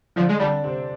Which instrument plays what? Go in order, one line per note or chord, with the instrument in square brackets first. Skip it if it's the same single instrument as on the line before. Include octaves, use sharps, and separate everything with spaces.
[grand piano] D3 D4 [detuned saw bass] F3
[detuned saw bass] G#3
[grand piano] D3 D4 [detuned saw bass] G3
[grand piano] C3 C4